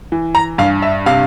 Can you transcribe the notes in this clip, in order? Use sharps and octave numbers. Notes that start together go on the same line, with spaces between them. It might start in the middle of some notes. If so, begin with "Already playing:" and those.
E3
A#5
G2 F5
E5
C3 F5